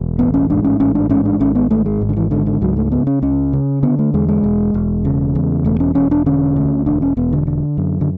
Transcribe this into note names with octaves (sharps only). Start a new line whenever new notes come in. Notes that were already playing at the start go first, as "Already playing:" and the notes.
Already playing: E1
A1 B3
C#4
G#2 D4
C#4
A1 C#4
D4
G#2 C#4
D4
G#1 C#4
B3
G#2 A3
G#3
G#1
D3
E3
G#2 D3
D3
C#2 F#3
A3
C#3 B3
C#4
C#2 C#4
C#3
D3 B3
A3
E2 G#3
G#3
E1
E1
C#3
E2
E1 A3
C#4
E1 C#4
D4
D3 C#4
D2
E1 D4
C#4
E1 B3
D3
D3
F#2
D3